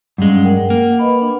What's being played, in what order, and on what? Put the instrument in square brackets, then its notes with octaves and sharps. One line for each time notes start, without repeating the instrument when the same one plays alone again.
[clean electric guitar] G2 G#3 [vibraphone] F#3 C#4 F5
[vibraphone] A#4 F#5 G5
[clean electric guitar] A#3
[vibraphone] B4 D#5 B5
D4 F#5